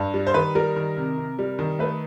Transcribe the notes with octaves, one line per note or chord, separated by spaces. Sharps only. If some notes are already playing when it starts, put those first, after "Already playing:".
Already playing: G2
G3
C5
D#3 B4
G3 A#4
D#3
C3
C3
G3
D#3
A3 B4